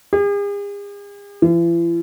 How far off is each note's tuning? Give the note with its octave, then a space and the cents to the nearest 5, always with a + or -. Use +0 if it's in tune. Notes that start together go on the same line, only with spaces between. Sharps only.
G#4 -45
E3 +45